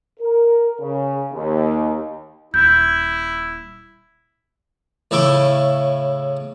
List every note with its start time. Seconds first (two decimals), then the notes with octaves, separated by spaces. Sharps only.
0.20 A#4
0.81 C#3
1.33 D#2
2.54 D#1 E4 G6
5.11 A2 C#3 E4 G5 D6